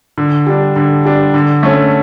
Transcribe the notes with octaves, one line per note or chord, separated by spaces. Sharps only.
D3
G3 D4
D3
G3 D4
D3
A3 C#4